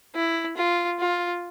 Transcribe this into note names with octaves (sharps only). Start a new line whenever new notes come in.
E4
F4
F4